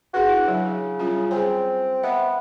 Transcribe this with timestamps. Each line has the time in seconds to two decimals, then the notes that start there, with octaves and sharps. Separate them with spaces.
0.14 D4 F#4 G#4 B4
0.28 D4 E4
0.48 C#3 F#3
0.99 G3 C#4 F4
1.31 C4 G#4 G#5
2.03 B3 D#5 E5